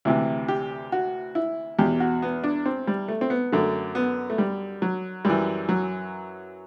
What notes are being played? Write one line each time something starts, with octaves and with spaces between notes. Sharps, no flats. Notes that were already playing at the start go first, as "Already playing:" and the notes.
D2 C3 E3 E4
G4
F#4
E4
E2 B2 G4
F#4
B3
D4
C4
G3
A3
C4
B3
F#2 D3 A3
B3
A3
G3
F#3
F#2 E3 G3
F#3